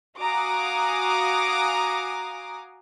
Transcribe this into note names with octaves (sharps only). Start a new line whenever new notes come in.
F#4 F5 G#5 A#5 D6 D#6